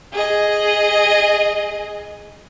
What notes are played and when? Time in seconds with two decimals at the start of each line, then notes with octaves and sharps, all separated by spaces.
0.13 G#4 D#5